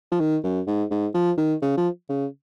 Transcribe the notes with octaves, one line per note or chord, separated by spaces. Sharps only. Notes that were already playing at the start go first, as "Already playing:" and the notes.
F3
D#3
F#2
G#2
G#2
F3
D#3
C#3
F3
C#3